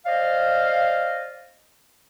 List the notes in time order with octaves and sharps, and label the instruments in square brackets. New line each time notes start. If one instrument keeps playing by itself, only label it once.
[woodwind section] C5 D5 D#5 F5